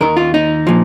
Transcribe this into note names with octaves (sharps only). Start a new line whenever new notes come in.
D#2 D#3 A#4
F4
D#4
A#2 F3